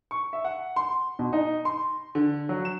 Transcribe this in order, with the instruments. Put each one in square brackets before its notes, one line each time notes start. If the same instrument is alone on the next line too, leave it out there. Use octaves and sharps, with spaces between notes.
[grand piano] C#6
E5
F#5
C6
B2
D#4
C6
D3
F#3
E7